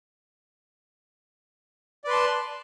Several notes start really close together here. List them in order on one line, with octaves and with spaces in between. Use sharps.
D5 B4 C6 A5